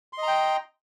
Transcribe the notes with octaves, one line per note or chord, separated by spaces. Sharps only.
D#5 G5 A#5 C6